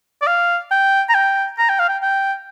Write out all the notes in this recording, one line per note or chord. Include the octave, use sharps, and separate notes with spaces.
D5
F5
G5
A#5
G5
A#5
G5
F5
G5
G5